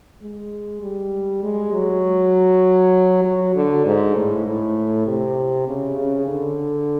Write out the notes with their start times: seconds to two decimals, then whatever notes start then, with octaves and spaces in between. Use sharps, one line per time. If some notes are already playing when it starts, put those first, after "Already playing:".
0.22 G#3
0.82 G3
1.43 G#3
1.73 F#3
3.25 F#3
3.55 D3
3.85 G#2
4.15 A2
4.46 A2
5.07 C3
5.68 C#3
5.97 C#3
6.27 D3